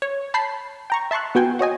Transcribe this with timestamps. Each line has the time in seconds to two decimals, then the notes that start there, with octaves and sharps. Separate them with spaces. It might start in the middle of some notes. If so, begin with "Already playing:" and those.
0.02 C#5
0.34 A5 B5 G6 B6 C7
0.90 G5 A#5 C#6
1.11 E5 A5 C6 C#6 F#6
1.35 B3 F#4 G5 G#5
1.59 F#4 C#5 D#5 G#5